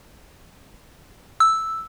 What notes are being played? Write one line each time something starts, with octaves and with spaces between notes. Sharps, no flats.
E6